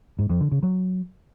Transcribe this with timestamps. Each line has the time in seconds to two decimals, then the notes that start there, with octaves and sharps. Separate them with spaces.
0.19 G#2
0.30 F2
0.41 D3
0.52 C#3
0.63 F#3